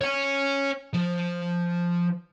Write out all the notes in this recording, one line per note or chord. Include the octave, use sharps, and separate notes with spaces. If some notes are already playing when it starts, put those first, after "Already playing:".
C#5 G#5
F3